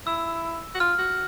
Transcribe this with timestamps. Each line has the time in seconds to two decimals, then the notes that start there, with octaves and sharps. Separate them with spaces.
0.07 E4 E6
0.74 F#4
0.80 F4 F6
0.99 F#4